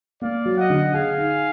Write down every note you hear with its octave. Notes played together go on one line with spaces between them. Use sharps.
A#3 D5 F5
F#3
D#5 F#5
D3
G#4 F5 G#5
D#4